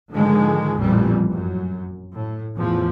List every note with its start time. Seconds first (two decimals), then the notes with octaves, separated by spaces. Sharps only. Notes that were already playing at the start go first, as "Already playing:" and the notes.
0.11 G#2 D3 D#3 F3 G#3
0.78 A1 F2 A#2 E3 G3
1.31 F#2
2.13 A2
2.56 E2 A2 F3